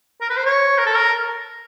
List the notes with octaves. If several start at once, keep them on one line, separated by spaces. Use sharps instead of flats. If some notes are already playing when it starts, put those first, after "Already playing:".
A#4
B4
C5
C#5
A#4
A4
A#4